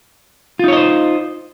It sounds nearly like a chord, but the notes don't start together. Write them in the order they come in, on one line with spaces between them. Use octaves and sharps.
F4 D#4 C#5 D#5 C5